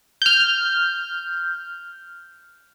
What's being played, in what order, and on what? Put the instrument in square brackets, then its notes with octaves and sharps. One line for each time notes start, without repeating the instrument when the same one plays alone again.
[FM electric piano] F6 G6